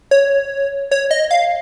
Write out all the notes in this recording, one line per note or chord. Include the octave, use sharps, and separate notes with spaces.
C#5
C#5
D#5
F5